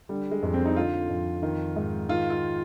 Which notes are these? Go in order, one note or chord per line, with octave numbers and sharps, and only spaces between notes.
D3 G3
G#3
F2
C4
D#4
D3 F4
F2
D#3
G#2
D#3 F4
F4